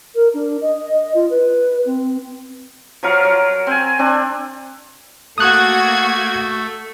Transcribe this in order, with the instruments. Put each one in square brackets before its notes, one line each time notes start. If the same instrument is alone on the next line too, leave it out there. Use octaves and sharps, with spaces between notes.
[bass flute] A#4
D4
D#5
F4
B4
C4
[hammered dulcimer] F3 F#3 A#4 F5
F#3
C4 G#5
C4 D4
[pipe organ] A3 [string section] A#3 F#4 G#6 [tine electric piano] D#6 F#6